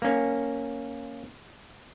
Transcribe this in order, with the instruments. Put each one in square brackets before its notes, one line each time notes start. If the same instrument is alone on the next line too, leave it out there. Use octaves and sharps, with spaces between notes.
[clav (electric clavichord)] A#3 C#4